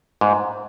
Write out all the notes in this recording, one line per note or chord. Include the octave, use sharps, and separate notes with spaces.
G#2